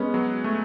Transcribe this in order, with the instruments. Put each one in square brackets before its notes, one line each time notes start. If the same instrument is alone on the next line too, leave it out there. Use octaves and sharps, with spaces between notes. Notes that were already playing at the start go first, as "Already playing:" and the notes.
Already playing: [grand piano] G#3 B3 [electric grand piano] C#4
[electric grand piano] F#3
A3